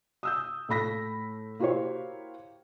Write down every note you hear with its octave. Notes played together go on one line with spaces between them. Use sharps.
D#6 E6 G6
A2 A3 B5 A#6 B6
A#3 E4 F#4 G4 C5 C#5